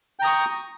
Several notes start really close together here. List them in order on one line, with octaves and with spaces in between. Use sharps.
G5 A#5 D#6 C#6